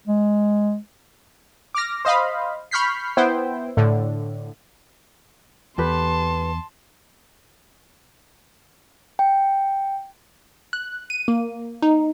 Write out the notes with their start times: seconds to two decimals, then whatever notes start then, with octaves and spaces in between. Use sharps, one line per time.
0.08 G#3
1.75 D6 F6 A#6
2.05 C5 D#5 F5 B5
2.71 B5 C#6 F6 G6 B6 C7
3.17 B3 E4 C5 G5
3.77 A2 D3
5.78 E2 G4 A4 B4 A5 C6
9.19 G5
10.73 F#6
11.10 D#7
11.28 A#3
11.82 D#4